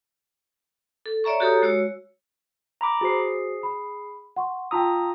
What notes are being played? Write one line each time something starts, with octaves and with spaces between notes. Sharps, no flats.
A4
C#5 D5 E5 A#5 C#6
F#4 G4 A4 C#5 A#5 D#6
G#3 F#4 C#5 E6
A#5 B5 D6
F#4 G#4 C5 C7
B5
F#5 C6 C#6
F4 G5 A5 A#5 D#6 E6